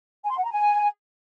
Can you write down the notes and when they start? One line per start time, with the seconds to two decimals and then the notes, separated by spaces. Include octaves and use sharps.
0.24 G#5
0.30 C6
0.37 F#5
0.44 A#5
0.50 G#5